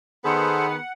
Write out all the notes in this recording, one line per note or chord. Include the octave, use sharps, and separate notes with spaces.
D#3 B3 G#4 A4 C5 F#5